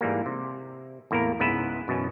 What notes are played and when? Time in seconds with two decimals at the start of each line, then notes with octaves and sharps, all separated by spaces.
0.01 G#2 E3 G3 A#3
0.26 C3
1.11 E2 A2 A#3 E4 A#4
1.40 C#2 G#2 B3 E4 B4 E5
1.88 F#2 B2 E3 C#4